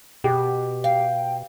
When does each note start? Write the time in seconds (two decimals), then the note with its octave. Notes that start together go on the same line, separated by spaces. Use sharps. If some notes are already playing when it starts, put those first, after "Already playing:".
0.24 B2 G4
0.84 F5 G5